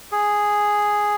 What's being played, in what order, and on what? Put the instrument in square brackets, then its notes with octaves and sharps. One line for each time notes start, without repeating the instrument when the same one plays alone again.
[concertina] G#4